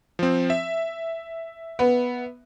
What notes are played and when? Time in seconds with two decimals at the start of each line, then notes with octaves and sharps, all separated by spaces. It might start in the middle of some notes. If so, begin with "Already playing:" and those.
0.19 F3 C4
0.50 E5
1.79 B3